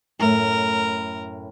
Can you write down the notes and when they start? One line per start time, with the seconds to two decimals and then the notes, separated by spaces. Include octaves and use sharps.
0.19 F#2 A2 A3 A#4